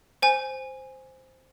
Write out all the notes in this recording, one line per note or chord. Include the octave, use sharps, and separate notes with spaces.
C5 G#5